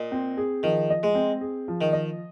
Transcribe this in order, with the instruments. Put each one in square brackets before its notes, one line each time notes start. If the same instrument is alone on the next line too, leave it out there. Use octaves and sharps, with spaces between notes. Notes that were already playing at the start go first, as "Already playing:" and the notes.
Already playing: [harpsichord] A#2 [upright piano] D#5
[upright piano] C4
G#4
[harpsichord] D#3 [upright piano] F3
[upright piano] D#5
[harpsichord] G#3
[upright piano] C4
G#4
F3
[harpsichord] D#3
[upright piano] D#5